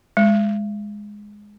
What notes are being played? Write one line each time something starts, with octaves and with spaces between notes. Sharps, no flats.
G#3